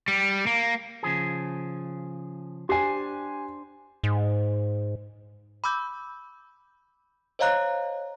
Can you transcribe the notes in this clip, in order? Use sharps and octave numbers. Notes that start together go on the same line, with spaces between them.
G3
A#3
C#3 F3 G#4
D4 G4 C5 G#5
G#2
B5 D6 E6 G6
C5 C#5 D#5 F5 A#5 F#6